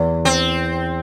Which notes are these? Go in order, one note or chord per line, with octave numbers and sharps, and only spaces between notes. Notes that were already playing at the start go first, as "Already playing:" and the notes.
Already playing: E2
C4